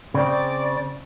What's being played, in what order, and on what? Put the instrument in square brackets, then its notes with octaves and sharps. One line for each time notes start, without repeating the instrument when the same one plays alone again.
[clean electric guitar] C#3 C4 [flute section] D5